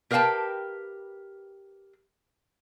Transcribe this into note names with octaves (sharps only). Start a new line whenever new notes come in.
G4 A#4 B4 F5 G5 A5